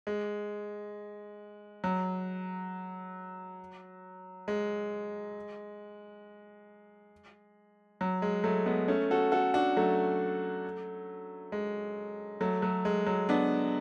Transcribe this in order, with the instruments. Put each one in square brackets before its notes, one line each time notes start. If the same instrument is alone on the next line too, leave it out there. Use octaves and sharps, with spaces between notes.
[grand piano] G#3
F#3
G#3
F#3
G#3
F#3 A3
G#3 B3
A3 C#4
F#4 A4
F#4 A4
D4 F#4
F#3 A3
G#3
F#3 A3
F#3 A3
G#3
F#3
B3 D4